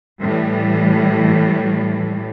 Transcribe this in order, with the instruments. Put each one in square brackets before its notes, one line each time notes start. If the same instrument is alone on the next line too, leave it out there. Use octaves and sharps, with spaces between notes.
[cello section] A2 E3 G3